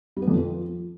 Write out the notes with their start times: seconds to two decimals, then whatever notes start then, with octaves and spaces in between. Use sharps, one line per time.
0.17 G3
0.22 B3
0.28 F2
0.33 F3